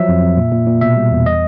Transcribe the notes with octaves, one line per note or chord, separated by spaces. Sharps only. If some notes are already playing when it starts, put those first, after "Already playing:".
Already playing: F3 F#3 E5
F2
F2
A#2
A#2
A#2
B2 E5
G3
E2
D#5